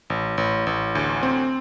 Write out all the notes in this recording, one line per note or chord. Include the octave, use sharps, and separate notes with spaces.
A1
A1
A1
D2
C4